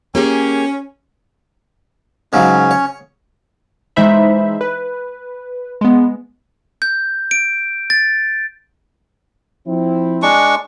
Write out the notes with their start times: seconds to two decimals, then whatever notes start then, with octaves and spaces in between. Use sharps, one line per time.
0.15 A#3 C#4 G4 G#4
2.33 G#2 C#3 F#3 C#4
2.71 C#5
3.96 E3 G#3 D#4 C5 E5 B5
4.61 B4
5.81 G#3 B3
6.82 G6
7.31 D7
7.90 A6
9.67 F3 C4 E4
10.22 G#3 D4 C#6